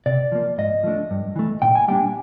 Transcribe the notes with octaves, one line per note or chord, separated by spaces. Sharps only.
C3 D5
F3 A#3
G#2 D#5
F3 A3 D4
G2
E3 A3
A#2 G5
G#5
G3 A#3 D4 G5